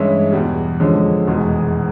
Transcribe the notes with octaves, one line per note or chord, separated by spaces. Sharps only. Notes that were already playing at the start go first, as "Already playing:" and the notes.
Already playing: G2 E3 G#3 C#4 E4
E2 B2 G3
F2 D3 F3 G#3 C#4
F1 E2 B2 G#3